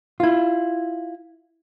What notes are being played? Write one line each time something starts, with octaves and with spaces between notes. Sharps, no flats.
E4 F4